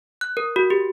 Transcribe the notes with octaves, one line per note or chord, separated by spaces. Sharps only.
F#6
A#4
F#4
G4